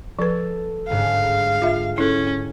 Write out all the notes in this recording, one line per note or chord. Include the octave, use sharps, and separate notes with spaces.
F3 A4 B4
G1 G#2 F5
F4 E5
C#4 E4 A4